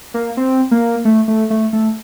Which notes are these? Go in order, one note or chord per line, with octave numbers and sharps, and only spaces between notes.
A#3
C4
A#3
A3
A3
A3
A3